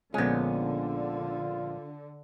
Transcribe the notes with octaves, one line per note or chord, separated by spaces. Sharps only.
A#1 D3 G#3 B3 C#4 F4